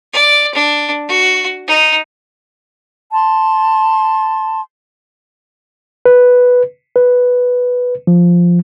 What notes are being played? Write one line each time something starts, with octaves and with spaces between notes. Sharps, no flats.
D5
D4
F#4
D#4
A5 C6
B4
B4
F3